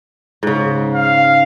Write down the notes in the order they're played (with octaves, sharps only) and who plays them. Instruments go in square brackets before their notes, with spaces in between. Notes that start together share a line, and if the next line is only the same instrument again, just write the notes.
[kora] G#2 C#3
[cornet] F5